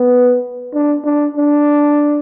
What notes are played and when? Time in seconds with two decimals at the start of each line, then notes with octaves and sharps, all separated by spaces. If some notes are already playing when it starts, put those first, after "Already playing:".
Already playing: B3
0.74 D4
1.05 D4
1.37 D4